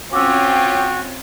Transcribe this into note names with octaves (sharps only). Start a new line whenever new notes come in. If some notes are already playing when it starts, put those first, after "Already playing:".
C4 C#4 F4 F#4 G5 D6 E6